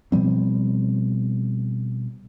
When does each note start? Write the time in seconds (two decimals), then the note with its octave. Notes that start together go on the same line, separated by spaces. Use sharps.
0.12 B2 F3 G3 C4